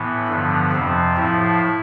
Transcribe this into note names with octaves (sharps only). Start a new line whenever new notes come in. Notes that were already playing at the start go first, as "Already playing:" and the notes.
Already playing: A2 E3 B3
G2 D3 F3
F2 C3 F3 C4
A2 F3 E4